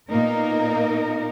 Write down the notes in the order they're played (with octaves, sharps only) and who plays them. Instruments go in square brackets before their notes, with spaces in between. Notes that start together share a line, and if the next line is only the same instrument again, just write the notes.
[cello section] A#2 A#3 B3 D#4 A#4